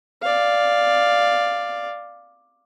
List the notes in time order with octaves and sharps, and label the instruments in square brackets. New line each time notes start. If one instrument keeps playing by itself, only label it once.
[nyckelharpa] D5 F5